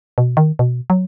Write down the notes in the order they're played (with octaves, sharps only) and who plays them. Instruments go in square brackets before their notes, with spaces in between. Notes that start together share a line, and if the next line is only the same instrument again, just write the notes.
[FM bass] B2
D#3
B2
F#3